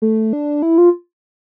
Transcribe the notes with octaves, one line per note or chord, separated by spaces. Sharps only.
A3
D4
E4
F4